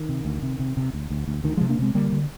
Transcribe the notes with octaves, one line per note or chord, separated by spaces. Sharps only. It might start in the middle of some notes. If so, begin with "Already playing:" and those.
Already playing: D#3
C3
D2
C3
C3
C3
D2
D2
D2
D2 D#3
C3 F3 G#3
A#3 D4
C3 G#3 C4
D3 G3 A#3
D3